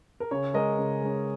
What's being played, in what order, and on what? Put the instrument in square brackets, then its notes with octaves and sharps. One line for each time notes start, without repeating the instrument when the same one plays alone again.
[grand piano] A#4
C#3 C#5
G#3 C#4 A#4 D#5
C#3
G#3 C#4